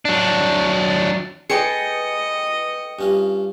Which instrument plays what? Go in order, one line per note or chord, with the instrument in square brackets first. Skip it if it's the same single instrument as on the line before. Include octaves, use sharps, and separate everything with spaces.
[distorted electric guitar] F#3 D4
[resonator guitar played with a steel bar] G#4 A4 [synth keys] B4 G5 C#7 [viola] D#5
[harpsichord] G2 C#4 F4